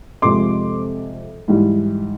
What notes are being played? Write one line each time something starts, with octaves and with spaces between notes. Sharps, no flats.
F2 C3 F3 G#3 C6 D6
G#2 E3 G3